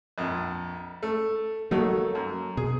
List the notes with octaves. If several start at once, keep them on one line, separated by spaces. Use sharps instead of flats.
A#1 F2
A3
F#3 A3 A#3 D#4
F#2
B2 G#4